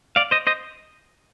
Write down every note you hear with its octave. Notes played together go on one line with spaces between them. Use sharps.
D5 F5
C5 D#5
C5 D#5